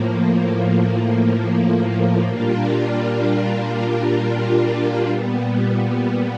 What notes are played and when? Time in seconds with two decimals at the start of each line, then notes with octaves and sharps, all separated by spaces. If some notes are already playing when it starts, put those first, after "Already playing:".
Already playing: A2 F3 A#3
2.24 A#2 G3 A#3 D4 F4
5.06 A#2 G3 B3